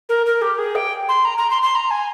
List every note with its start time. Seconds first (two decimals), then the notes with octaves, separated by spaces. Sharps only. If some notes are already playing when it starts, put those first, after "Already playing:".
0.09 A#4
0.26 A#4
0.41 G4
0.58 G#4
0.75 G5
1.08 C6
1.25 A#5
1.37 A#5
1.50 C6
1.62 C6
1.75 A#5
1.90 G#5